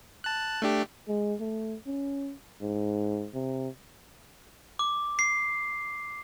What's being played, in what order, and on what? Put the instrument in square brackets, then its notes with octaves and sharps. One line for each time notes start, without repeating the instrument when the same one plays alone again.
[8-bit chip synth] A5 F#6
A3 D4 G4
[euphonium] G#3
A3
C#4
G#2
C3
[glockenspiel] D6
C7